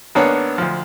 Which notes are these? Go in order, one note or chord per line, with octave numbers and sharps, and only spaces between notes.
G#1 A#3 B3 D4 C#5
D2 F3